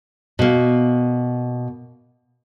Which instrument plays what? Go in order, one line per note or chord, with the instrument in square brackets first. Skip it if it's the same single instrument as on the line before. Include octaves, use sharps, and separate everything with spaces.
[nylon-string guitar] B2 A#3